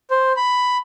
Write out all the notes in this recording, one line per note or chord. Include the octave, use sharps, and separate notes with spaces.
C5
B5